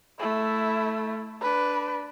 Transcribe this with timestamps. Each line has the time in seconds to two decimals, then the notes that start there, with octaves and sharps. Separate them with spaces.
0.20 A3 E4
1.42 D4 B4